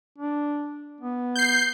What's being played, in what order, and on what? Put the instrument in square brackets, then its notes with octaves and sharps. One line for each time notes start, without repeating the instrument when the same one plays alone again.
[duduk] D4
B3
[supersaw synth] G6 C7